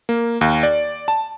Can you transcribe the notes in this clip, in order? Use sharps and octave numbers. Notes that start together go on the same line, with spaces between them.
A#3
D#2
D5
A5